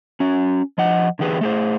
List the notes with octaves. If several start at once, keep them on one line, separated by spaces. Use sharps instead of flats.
C#4 F#4
F3 D#5 F#5
D3 E3 G4 G#4 B4
A3 G#4 C5